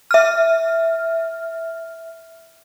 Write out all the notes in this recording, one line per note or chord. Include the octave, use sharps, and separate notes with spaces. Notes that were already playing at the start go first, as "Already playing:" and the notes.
E5 F6